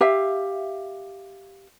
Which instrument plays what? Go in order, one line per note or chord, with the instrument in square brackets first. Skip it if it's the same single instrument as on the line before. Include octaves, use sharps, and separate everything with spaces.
[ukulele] G4 E5 F5